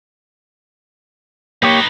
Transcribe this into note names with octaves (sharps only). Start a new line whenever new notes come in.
A#3 D#4 G4 B4 C#5